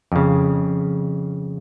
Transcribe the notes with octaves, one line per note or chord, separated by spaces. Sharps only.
F2 C#3